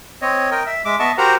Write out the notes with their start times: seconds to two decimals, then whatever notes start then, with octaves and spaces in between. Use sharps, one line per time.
0.22 C4 C#5 D#5
0.51 A#4 D#5 G5
0.66 E5
0.85 G#3 E5 D6
0.99 B3 D#5 E5 A5 C#6
1.18 F#4 G4 A#4 C5 F#5 A#5